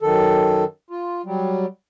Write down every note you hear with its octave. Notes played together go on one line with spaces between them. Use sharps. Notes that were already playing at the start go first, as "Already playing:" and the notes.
F#2 D#3 A4
F4
F#3 G3